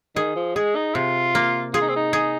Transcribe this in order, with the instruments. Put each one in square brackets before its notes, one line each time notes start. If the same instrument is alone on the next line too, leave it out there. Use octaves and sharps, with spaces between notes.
[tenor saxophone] D#3 [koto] G#4
[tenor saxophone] F3
[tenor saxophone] G#3 [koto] G#4
[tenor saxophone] D#4
[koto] C3 [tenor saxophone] F4
[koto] A#3
[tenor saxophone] F4 [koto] G#4
[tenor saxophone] D#4
C4
D#4
[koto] G#4